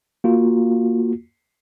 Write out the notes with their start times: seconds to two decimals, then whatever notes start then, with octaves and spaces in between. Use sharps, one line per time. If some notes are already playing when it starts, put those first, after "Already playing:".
0.24 A#3 F4 F#4